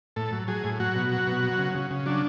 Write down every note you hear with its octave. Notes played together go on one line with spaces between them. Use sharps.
A2 A4
F#3
F#3 G#4
A2
F#3 F#4
B2
F#3
B2
F#3
C#3
C#3
C#3
F#3 D4